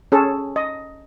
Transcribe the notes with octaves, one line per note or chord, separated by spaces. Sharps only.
C#4 G#4 A4
D#5